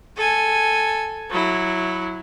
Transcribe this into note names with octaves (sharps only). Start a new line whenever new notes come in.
A4 G#5
F#3 E4